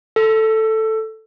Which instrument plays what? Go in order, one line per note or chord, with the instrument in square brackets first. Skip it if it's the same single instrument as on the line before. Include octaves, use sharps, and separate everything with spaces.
[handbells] A4